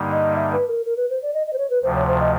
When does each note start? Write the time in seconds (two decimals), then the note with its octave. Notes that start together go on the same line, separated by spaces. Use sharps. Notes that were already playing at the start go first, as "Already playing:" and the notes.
Already playing: G2 D3 G3 A#3 D#4
0.11 D#5
0.36 E5
0.52 B4
0.68 A#4
0.86 A#4
0.97 B4
1.10 C5
1.22 D5
1.34 D#5
1.47 D#5
1.53 C5
1.58 C#5
1.70 B4
1.83 D2 C3 F3 C5
1.95 C#5
2.08 C5
2.20 D#5